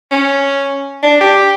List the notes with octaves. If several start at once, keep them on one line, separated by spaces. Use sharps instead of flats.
C#4
D4
G4